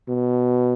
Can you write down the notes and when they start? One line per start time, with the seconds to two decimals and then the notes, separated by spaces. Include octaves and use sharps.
0.08 B2